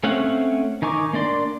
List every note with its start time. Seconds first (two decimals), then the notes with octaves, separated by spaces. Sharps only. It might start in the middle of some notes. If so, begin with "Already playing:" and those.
0.04 A3 C4 C#4 F5 F#5
0.82 D#3 D#4 G#5 C#6 D6
1.13 A#3 D4 D5 C6